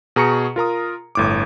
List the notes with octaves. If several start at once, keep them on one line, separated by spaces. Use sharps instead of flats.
B2 G#4 A#5 C#6 C#7
F4 A#4 A#5 D#6
G1 A2 D6